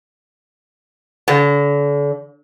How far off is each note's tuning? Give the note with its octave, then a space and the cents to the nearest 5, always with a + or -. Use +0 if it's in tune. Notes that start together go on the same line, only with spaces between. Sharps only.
D3 -40